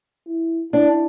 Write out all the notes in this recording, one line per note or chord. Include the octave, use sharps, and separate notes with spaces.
E4
D4 E4